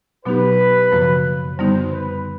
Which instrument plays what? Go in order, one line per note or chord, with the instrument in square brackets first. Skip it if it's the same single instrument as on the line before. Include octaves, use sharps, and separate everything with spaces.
[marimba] B2 F#3 B3 D#4 G4 [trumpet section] B4
[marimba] F#2 C#3 F3 A#3
[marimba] F#2 D3 G3 B3 D#4 [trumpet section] C5
[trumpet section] B4